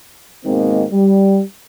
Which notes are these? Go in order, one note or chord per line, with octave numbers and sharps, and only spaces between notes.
G#1 B2 D#3 G#3 A#3 C4
G3